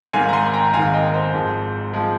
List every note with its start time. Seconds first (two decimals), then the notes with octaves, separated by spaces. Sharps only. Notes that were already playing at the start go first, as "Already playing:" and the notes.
0.13 G#1 G#2 D#3 F5 G#5
0.29 A#5
0.33 G#5 C6
0.53 G5 A#5
0.73 G#1 G#2 D#3 F5 G#5
0.94 D#5 G5
1.14 C5
1.34 G#1 G#2 F3 G#3
1.94 F3 G#3